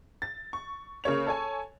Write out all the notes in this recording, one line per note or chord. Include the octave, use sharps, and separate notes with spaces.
A6
C#6
C#3 A#3 C#5 F7
A4 C#5 G#5